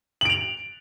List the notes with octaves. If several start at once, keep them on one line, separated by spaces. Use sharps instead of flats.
D7 F7 F#7